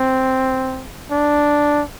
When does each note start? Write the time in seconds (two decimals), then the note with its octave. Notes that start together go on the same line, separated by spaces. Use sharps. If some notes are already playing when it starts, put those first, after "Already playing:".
Already playing: C4
1.11 D4